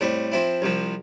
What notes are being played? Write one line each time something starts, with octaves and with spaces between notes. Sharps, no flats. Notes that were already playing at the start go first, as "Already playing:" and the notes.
A2 G3 C4
F3 C4 E4
C2 C3 F3